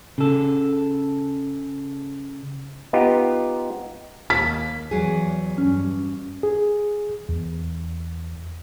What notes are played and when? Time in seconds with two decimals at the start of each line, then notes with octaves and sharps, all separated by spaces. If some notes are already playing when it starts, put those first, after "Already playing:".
0.18 C#3 A4
2.93 B3 D#4 F4 G4
4.30 D#2 A#3 B6
4.91 E2 F#3 G#4
5.58 G2 C#4
6.43 G#4
7.29 E2